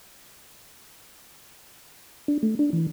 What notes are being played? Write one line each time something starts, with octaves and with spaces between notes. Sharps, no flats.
D4
A3
D4
E3